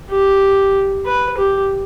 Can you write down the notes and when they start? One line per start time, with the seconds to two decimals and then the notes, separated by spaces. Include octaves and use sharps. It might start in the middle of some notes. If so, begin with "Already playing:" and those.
0.11 G4
1.06 B4
1.38 G4